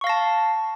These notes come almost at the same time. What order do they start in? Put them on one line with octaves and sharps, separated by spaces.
C#6 F5 A#6 A5